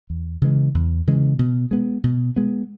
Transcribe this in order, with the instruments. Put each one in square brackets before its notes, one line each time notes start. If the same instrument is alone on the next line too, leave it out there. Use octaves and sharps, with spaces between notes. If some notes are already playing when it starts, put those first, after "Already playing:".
[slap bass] E2
C#3 E3 G#3
E2
C#3 E3 G#3
B2
G#3 B3
B2
G#3 B3